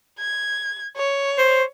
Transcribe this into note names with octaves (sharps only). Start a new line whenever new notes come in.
G#6
C#5
C5